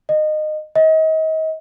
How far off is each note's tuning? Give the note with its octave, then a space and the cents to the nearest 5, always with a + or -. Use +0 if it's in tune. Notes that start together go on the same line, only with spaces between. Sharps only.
D#5 -20
D#5 +35